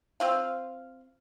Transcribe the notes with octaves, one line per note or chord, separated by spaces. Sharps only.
C4 F4 F5